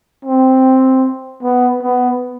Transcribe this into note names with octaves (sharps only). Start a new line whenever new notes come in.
C4
B3
B3